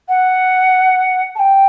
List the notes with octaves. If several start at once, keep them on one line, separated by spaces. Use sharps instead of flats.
F#5
A5
G5